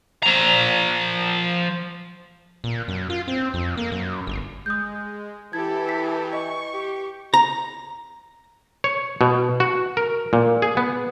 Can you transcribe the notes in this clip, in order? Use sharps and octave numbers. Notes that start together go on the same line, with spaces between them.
F3 A#5
A#2
F#2
F4
C4
F2
A#3
F#2
G1
G#3 D#6 G6
E3 E4 G4 A4 G#6
B6
D#5 C#6
G4
A#5
C#5
B2
F#4
A#4
A#2
G#4
B3